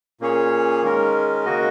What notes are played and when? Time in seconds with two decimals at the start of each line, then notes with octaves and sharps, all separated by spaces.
0.21 A#2 A#3 C#4 G#4 C#5
0.82 D#3 G#3 C#4 A#4
1.45 C#3 A#3 F#4 D#5